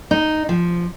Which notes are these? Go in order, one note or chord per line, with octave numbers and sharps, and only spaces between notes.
D#4
F3